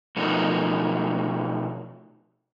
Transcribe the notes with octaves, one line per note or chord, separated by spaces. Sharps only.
B2 F3 A3 D#4 F#4 A#4